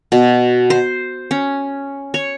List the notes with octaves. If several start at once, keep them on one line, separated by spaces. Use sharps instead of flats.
B2
C5
C#4
C#5